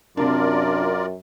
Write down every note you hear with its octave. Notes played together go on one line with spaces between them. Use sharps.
F#2 C3 D4 F4 A#4 D5